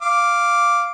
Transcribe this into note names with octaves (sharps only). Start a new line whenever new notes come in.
F5 D6